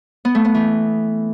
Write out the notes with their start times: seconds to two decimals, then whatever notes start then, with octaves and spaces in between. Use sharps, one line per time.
0.25 B3
0.35 A3
0.45 B3
0.54 E3